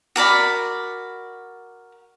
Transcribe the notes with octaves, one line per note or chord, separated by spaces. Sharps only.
F#4 A#4 D5 B5